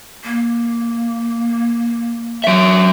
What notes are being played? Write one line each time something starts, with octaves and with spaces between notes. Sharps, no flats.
A#3
F#3 E5